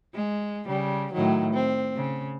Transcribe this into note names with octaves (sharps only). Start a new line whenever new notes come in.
G#3
C#3 G3
A2 D#3 F#3
C4
C#3